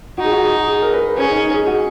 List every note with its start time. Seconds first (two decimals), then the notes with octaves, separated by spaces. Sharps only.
0.18 D#4 F#4
0.25 G#4
0.32 F#4
0.68 G#4
0.82 A#4
0.93 B4
1.17 C#4 G#4
1.30 D#4
1.43 D#4
1.54 G#4
1.67 F#4